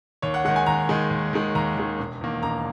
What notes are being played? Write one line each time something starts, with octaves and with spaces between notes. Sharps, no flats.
D#2 C#5
F#5
D#3 G#3 F#5
G#5
D#2 A#5
D#3 G#3
D#2
D#3 G#3
D#2 A#5
D#3 G#3
E1
E2 D#3 A#3
E1 A#5